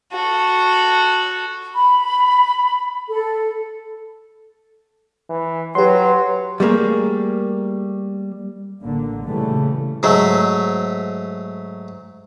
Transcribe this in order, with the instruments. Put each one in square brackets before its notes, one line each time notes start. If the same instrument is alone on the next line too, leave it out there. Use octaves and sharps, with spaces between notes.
[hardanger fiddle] F#4 A4
[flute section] B5
A4
[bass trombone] E3
[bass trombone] F#3 [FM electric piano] G4 C6 [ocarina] B4
[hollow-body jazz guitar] G3 A3 A#3 G#4
[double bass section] A1 D3 A#3
A#2 C#3 E3 G3 A3
[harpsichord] G#2 F#3 A3